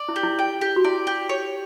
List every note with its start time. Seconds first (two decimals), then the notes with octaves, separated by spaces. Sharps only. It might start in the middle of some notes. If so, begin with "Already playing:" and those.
Already playing: D5
0.09 E4
0.16 G4
0.23 E4
0.39 G5
0.61 G4
0.76 F#4
0.84 E4 D5
1.07 G4
1.29 C#5